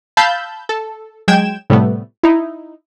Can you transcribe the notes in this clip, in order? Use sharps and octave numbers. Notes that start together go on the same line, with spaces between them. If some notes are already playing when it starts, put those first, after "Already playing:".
F5 A5 B5 E6 G6
A4
F#3 G#3 G5 G#6 E7
A2 C3 G3 A3 B3
D#4 E4